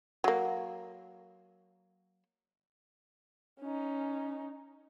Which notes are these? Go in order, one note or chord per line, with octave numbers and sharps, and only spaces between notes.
F#3 A#3
C#4 D#4